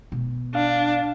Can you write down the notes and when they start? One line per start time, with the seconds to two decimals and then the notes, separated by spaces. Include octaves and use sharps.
0.12 B2
0.55 D4 F5